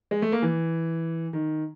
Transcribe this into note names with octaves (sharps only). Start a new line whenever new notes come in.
G#3
A3
A#3
E3
D#3